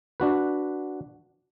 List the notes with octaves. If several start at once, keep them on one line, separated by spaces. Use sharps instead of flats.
D4 F#4 B4